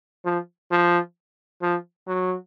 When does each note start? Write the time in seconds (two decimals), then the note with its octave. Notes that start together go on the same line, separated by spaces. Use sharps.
0.25 F3
0.71 F3
1.62 F3
2.07 F#3